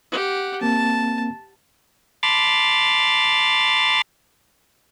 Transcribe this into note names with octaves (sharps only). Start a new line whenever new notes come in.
G4 F#5
A#3 C4 A5
A5 B5 C6 D6 F6 A6